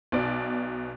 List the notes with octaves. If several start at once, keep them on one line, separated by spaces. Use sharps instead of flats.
B1 B2 D5